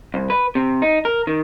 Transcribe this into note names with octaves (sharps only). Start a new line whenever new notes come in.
C2
B4
C3
D#4
A#4
D#3